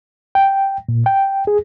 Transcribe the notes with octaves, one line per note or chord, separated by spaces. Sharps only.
G5
A#2
G5
G#4